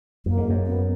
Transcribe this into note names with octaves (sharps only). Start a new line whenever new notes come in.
F#2 A#3
G#2
F#2
B3